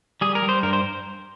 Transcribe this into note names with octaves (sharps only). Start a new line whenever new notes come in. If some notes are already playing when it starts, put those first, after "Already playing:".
G3 G#4
A#4
G3
C5
G2 A#4
C5